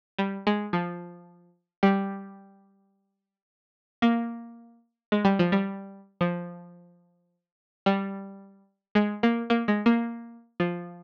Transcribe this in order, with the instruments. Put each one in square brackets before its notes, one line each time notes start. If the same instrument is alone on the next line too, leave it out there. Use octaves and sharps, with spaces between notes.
[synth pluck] G3
G#3
F3
G3
A#3
G#3
G3
F3
G3
F3
G3
G#3
A#3
A#3
G#3
A#3
F3